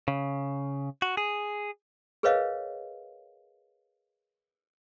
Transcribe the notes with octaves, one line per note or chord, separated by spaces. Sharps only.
C#3
F#4
G#4
G#4 A#4 B4 C#5 D#5 F5